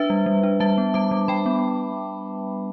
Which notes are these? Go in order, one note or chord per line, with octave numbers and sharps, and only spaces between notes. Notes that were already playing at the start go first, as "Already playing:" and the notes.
Already playing: D4 B4 E5
G3
G3
D4
G3 E5 A5
B3
G3 A5 D6
G3
G3 G5 B5
B3